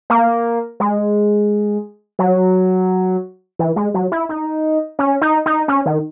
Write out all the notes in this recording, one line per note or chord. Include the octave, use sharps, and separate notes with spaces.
A#3
G#3
F#3
E3
G#3
F#3
E4
D#4
C#4
D#4
D#4
C#4
D#3